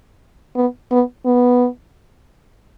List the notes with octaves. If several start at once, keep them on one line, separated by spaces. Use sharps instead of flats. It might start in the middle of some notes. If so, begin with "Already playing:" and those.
B3
B3
B3